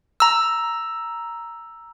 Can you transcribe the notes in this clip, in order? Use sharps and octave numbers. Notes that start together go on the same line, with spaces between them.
A#5 E6